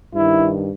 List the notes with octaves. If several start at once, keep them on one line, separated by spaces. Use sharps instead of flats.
G2 D#3 E4